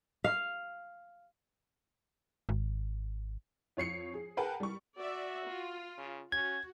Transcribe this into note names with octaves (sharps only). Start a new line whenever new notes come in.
F5
G#1
F2 C#5 C7 C#7
G#4
G#4 A#4 B4 F#5 G5 A5
G3 C#6
F#4 D5 E5
F4
C#3
C#4 F#4 G#6